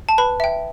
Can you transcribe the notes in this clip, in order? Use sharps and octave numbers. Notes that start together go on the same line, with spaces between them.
A5
B4 B5
E5 G5